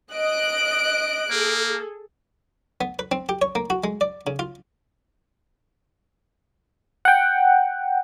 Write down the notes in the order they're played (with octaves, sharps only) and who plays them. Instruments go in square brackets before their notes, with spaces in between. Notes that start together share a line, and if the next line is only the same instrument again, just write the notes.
[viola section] D#5 [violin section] F#6 D7
[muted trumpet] A#3 [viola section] G#4 A4
[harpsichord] B3
B4
C4
G4
C#5
A#3
F#4
G#3
D5
C#3
F4
[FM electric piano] F#5 G5